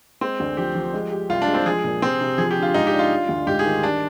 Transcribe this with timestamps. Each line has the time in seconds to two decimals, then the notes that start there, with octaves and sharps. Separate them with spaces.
0.21 G#3 C4
0.40 D2
0.57 F3 G4
0.75 F3
0.94 G#3
1.12 G4
1.29 C2 F4
1.42 D4
1.47 G#3
1.54 C4
1.65 F3 G#4
1.84 A#2
2.02 C3 C4
2.21 C3
2.38 F3 G#4
2.51 G4
2.56 D3
2.62 F4
2.74 G#2 D#4
2.87 G4
2.93 D4
2.99 F4
3.11 G3
3.29 D2
3.47 G#2 G4
3.59 G#4
3.66 D#3
3.83 G3 D4